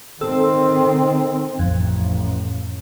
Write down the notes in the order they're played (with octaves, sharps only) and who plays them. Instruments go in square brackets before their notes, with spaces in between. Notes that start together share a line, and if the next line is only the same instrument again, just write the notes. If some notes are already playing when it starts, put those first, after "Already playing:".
[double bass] D#3 C4 [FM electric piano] A4 E6
[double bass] A1 [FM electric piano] F2